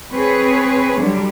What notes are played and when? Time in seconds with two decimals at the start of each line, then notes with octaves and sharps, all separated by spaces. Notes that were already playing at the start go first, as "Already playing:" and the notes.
0.14 C4 G#4 B4 C#5
1.00 D3 F#3 G3